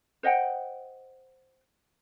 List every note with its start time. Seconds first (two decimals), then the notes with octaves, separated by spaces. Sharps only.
0.23 C5 D#5 F#5 G5